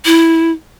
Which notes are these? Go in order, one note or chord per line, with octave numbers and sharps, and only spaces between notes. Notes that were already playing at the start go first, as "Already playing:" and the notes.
E4